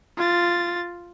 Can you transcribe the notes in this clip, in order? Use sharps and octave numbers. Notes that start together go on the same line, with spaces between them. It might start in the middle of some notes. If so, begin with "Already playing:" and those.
F4 A6